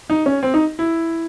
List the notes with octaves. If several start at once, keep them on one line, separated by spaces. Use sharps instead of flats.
D#4
C#4
C4
D#4
E4